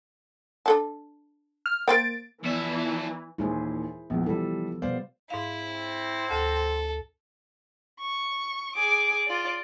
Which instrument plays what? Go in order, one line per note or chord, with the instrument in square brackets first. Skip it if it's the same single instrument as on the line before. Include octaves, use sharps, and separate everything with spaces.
[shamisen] D4 A4 A5
[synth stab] F6
[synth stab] A#3 A6 D7 [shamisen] A#4 C5 G5
[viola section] E3 [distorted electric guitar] F3 E5 [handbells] B3 D5
[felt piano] D#2 A#2 E3 [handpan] E4 G#4 C5
[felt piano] A#1 E2 [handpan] F3 B3
[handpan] C3 A4 [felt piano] E3 G3
[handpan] B2 G3 B3 [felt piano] C5 D5 F5
[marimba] G#2 F5 [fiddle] E4
[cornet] C4
[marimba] D2 [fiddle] A4
[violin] C#6
G#4 D6
F4 D5